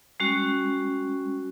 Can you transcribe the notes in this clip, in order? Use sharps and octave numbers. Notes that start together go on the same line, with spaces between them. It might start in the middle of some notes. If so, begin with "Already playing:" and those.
G3 G#3 C#4 F#4